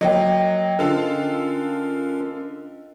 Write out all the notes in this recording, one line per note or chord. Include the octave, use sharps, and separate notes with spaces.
F#3 A#3 D#5 G5
D3 C#4 F4 A4 A#4